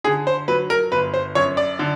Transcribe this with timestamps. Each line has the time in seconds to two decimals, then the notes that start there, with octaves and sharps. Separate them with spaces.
0.04 D3 G#4
0.27 C5
0.48 F#3 B4
0.70 A#4
0.92 G1 B4
1.14 C5
1.35 F#2 C#5
1.57 D5
1.79 D3